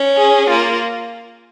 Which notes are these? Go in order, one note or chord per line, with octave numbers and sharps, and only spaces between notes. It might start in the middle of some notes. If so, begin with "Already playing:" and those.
Already playing: C#4
G#4
A#3 F4